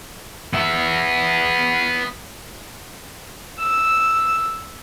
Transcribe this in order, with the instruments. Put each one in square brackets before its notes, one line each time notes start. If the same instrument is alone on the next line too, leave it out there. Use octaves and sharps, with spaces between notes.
[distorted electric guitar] B3 E5
[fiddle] E6